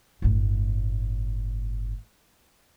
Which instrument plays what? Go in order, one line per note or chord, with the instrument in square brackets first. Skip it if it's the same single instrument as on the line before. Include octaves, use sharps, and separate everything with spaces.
[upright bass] G1 A2